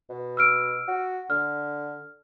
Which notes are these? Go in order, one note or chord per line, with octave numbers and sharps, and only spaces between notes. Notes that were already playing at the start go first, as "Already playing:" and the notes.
B2
E6 F6 D7
F#4
D3 F6